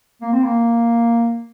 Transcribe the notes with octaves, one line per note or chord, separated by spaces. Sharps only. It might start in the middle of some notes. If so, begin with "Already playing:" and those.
A#3
C4
A#3